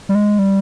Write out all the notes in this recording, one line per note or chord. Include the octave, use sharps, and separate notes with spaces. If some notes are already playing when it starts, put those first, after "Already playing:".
G3
G#3
G3